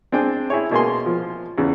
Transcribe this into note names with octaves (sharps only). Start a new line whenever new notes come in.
C4 D4 G#4 G5
E4 G#4 C#5
B2 A#3 G#4 C6
F3
E2 C#3